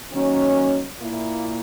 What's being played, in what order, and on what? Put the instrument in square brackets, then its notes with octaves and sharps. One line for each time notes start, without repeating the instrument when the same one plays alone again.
[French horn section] D#3 F#3 A#3 C#4
A#2 A#3 E4